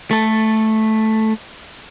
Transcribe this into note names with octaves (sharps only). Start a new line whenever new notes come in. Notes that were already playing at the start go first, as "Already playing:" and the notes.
A3 A4